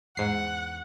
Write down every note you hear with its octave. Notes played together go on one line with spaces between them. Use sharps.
E2 G#2 F#5 C7